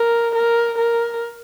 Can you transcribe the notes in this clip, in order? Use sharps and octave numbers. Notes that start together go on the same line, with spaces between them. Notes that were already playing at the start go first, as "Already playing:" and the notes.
Already playing: A#4
A#4
A#4